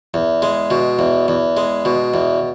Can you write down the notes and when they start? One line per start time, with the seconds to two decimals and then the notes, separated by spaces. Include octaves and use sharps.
0.14 E2
0.42 G#3
0.71 B2
0.99 E2
1.28 E2
1.57 G#3
1.85 B2
2.14 E2